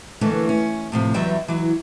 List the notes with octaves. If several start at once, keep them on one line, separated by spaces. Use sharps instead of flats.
D3 E3 A3 A#3 C#4
C#4
A2 C3 F3
E2 E3 F#3 G3 E5 G5
E3 F#3